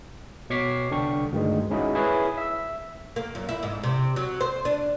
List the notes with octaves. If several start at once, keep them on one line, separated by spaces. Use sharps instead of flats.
B2 C#5 C#6 D6 B6 C7
C2 D3 D4 G5 C#6
D2 G2 D#3 G#3
G#3 C#4 D#4 E4 F#4 G#4
E4 G#4 B4 C#5
E5 E6
A#3
F#2
E4
G#2
C3
F#3
C5
D4